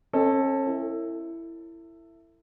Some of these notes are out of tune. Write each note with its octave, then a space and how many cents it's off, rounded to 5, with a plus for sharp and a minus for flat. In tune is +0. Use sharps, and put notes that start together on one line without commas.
C#4 -40 A4 +5 D#5 +0
E4 +10 A4 +40